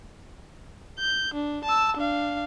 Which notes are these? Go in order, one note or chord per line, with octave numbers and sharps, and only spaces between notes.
G6
D4
A5 E6
D4 F5